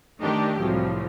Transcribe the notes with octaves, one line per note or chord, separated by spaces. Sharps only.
D#3 A3 D4 D#4 G4
C2 A2 F3 F#3